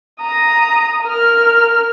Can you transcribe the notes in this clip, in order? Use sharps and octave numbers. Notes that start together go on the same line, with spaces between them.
A#5 D#6
A#4 F6